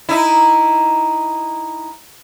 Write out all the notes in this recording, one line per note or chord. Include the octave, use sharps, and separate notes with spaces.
D#4 E4